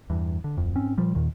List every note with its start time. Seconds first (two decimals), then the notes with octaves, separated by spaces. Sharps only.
0.10 E2 G2
0.44 D3
0.57 D1 F2
0.75 G#2 C4 C#4
0.98 A#2 F3 G3
1.15 D#2 A#2 D#3